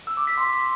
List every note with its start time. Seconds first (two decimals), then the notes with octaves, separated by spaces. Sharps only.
0.07 E6
0.17 D6
0.27 B6
0.37 C6